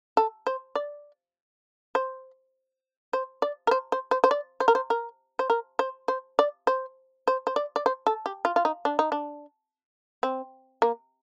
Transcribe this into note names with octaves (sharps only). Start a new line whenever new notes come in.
A4
C5
D5
C5
C5
D5
A#4
C5
C5
C5
C5
D5
C5
A#4
C5
A#4
C5
A#4
C5
C5
D5
C5
C5
C5
D5
D5
C5
A4
G4
F4
F4
D#4
D4
D#4
D4
C4
A#3